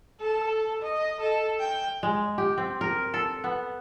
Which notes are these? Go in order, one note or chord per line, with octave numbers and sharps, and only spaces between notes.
A4
D#5
A4
G5
G#3
G4
C4
A#4
A4
B3